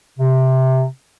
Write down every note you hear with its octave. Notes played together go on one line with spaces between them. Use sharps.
C3